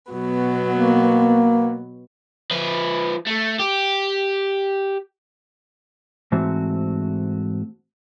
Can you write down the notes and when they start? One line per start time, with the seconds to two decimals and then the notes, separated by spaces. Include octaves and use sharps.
0.10 B2 F#3 B3
0.72 A#3
2.51 F3 B4
3.27 A3
3.59 G4
6.32 G#2 E3 A3 C4 F#4